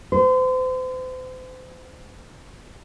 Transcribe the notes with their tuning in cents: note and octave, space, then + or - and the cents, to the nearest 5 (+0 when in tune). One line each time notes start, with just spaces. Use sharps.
C5 -40